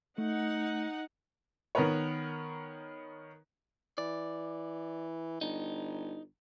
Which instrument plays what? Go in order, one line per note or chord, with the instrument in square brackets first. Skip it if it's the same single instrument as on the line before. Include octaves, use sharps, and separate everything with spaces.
[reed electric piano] A3 [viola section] D#4 F#5
[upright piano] D#3 B3 A#4 B4 C#5
[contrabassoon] E3 [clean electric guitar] D5
[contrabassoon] G1 [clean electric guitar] D#4